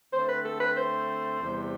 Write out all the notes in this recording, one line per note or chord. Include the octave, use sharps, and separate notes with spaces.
D3 A3 C4 C5
B4
A4
B4
C5
E2 C3 G3